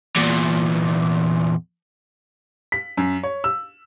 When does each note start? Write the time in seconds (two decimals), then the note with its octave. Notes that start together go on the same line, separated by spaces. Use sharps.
0.16 E2 A#2
2.72 B6
2.97 F#2
3.23 C#5
3.44 E6